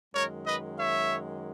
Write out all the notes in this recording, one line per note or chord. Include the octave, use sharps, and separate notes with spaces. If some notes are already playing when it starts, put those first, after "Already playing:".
F#2 D#3 G#3 A#4 C#5
B4 D#5
C#5 E5